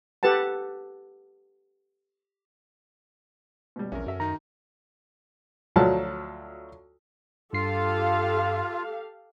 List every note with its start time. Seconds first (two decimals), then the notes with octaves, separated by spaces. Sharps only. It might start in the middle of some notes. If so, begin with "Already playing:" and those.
0.23 G4 A4 B4 F#5 A5
3.76 B2 G3
3.92 A#1 E2 C#4 A#4
4.06 F#2 F#4 A4 E5
4.20 D#3 D#4 A#5
5.76 D2 F3 F#3 A5
7.53 G2 F4 G4 A4 F5 C7